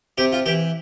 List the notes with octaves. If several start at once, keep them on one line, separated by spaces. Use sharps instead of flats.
C3 G4
F4
E3 G4